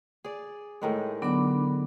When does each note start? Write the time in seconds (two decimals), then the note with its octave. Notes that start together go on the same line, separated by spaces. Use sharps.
0.24 G#4 D5
0.82 A2 D#3 G#3
1.22 D3 F#3 B3 D4 B5 D6